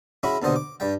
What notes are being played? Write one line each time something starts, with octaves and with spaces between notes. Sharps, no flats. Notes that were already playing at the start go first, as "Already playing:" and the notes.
G#3 C#4 E4 F#4 B5
D#2 B2 D3 C5 D#5 F#5
D6
G2 G3 G5